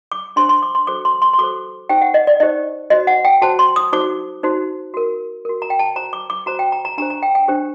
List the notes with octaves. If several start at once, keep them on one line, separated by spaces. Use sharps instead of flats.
D6
D4 G4 C5 C6
C6
D6
C6
F#4 A4 C5 D6
C6
C6
C6
F#4 A4 C5 D6
D#4 G4 C5 G5
F#5
D#5
D5
D#4 G4 C5 D#5
F#4 C5 D#5
F#5
G5
F#4 C5 A5
C6
D#6
D#4 F#4 C5 D6
D#4 F#4 C5
F#4 A#4
F#4 A#4
A#5
G5
A5
F#4 C5 A#5
D6
D6
F#4 C5 A#5
G5
A#5
A#5
D4 G4 C5 A#5
A#5
G5
G5
D4 G4 C5